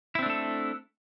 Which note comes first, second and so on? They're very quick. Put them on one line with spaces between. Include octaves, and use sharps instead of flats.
E4 C4 D4 A3 A4